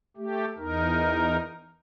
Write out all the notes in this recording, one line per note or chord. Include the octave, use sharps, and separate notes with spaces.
A3 G4
E2 D#4 A#4